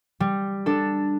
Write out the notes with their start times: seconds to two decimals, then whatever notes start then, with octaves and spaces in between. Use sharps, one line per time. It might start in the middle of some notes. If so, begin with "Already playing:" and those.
0.20 G3
0.66 D4 A4